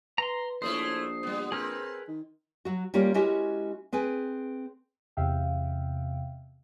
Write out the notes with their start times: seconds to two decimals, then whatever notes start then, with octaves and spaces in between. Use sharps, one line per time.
0.18 B4 A#5 C6
0.62 A#1 A3 C#4 E4 C5 D#6
1.23 G3 B3
1.52 C4 G#4 A#4 B4
2.08 D#3
2.65 F#3 F#4
2.94 G3 A#3 C#4 F4 G4
3.14 G#3 C#4 E4 F#4 G4 A#4
3.93 C4 G#4 B4 G#5
5.17 E2 C3 E5 F5 G5